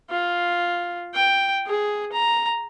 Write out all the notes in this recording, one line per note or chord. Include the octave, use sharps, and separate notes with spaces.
F4
G5
G#4
A#5